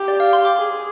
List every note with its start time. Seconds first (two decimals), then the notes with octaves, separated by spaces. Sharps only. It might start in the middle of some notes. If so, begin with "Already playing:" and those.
Already playing: G4
0.08 D5
0.20 F5
0.33 C6
0.45 D6
0.56 G#4